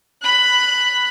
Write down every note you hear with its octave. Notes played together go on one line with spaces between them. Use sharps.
B5 F#6